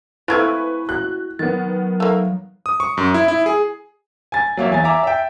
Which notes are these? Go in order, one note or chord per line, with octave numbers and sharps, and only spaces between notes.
A3 C4 E4 F4 B4 C#6 G#6
F#4 F#6
D#3 F#3 B3 A6
A3 A#3
D#6
C#6
F#2
E4
E4
G#4
G#5 A6
F#3 A#3 C#5 E5
E2 G#5 A6
E5 G#5 A#5 D6
E5 G5